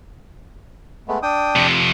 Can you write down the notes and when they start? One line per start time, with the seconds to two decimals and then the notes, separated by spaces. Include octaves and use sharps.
1.08 G#3 A3 B3
1.23 D4 G5 D#6
1.56 F2 C3